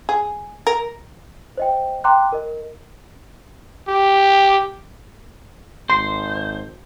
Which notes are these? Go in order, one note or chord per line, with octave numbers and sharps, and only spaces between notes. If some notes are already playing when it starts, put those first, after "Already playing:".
G#4
A#4
C5 D#5 G5
G5 A#5 C6 D6 F#6
A#4 D#5
G4
G#1 C5 C6